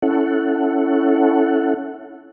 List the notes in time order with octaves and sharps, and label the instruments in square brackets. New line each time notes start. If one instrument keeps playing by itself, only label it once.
[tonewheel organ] C#4 E4 A4 F#5